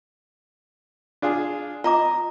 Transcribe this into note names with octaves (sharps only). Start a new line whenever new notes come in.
D4 F4 G#4
F4 D#5 A#5 D6